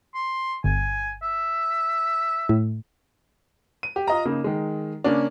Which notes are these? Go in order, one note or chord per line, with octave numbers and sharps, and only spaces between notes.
C6
G1 G#5
E5
A2
D#7
G4
F4 D#5 A#5
C#3 A#3 D#4
D#3 G#3
C#3 A#3 C#4 D4